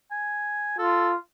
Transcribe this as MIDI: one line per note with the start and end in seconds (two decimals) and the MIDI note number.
0.11 0.76 80
0.79 1.16 65
0.79 1.10 69